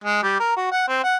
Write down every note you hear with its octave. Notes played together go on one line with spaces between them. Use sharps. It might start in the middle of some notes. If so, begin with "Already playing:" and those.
G#3
G3
A#4
F#4
F#5
C4
F#5